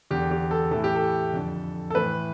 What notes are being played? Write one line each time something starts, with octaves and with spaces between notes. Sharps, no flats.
E2 D3 G4
G4
A4
A2 E3 A4
G4
A4
F2 D3
A4
A2 E3 B4